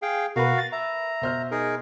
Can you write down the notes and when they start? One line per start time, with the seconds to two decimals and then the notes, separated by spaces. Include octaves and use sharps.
0.02 G#4 F5 G5
0.36 B2 F#4 A#4 B4 F5
0.58 A6
0.72 E5 A#5
1.22 B2 C5 F6
1.51 D#4 G#4 A#4